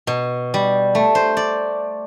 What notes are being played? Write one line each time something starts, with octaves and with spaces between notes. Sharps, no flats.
B2
G3
A3
C5
D5